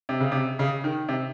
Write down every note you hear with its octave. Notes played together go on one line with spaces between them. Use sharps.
C3
C#3
C3
C#3
D#3
C3